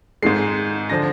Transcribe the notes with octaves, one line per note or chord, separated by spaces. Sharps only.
G#2 D#3 G#3 C7
D3 F3 A#6